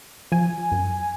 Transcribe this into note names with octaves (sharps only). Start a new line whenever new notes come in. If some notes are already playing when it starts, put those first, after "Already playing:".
F3 G#5
F#2